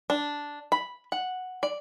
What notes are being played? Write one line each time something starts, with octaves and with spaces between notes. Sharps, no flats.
D4
B5
F#5
D5